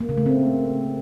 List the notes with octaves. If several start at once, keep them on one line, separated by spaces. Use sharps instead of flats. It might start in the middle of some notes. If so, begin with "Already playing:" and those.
A#3
C#3
A3
C4